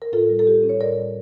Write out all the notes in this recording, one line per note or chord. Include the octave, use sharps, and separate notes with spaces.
A#4
A2 F4 A4
G3
A4
G3 G4
C#4
C#5
A2 A#4 D5
G3